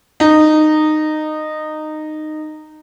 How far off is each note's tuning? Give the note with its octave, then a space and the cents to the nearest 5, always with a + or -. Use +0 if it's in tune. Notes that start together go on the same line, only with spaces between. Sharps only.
D#4 -15